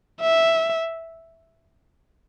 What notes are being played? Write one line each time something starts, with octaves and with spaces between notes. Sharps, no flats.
E5